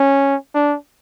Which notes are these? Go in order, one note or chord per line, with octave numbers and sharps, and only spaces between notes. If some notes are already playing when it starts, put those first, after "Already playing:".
Already playing: C#4
D4